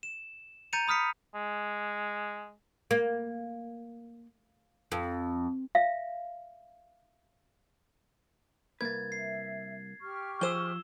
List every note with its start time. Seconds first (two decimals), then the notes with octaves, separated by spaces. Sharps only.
0.03 E7
0.73 A#5 G6 A6 C#7 D#7 F7
0.88 B5 D#6 F6 B6 C#7
1.35 G#3
2.91 A#3
4.92 F2
5.75 E5 F5
8.81 C2 A#3 B4 G#6 A6
9.12 E5 C7
10.01 G4 C#6 F6
10.41 F3 G#4 C5 E6 E7 G7